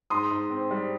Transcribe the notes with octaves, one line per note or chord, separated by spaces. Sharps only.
G#2 C6 D#6
G#2
C4
G3